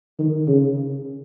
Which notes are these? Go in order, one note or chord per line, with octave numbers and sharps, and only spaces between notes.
D#3
C#3